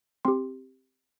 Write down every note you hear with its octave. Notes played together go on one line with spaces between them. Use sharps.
C4 G4 C6